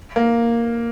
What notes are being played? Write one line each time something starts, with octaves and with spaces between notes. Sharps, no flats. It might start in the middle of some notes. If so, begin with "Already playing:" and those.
A#3